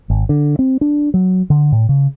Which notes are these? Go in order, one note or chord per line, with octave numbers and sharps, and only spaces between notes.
G#1
D3
C4
D4
F#3
D3
A2
C#3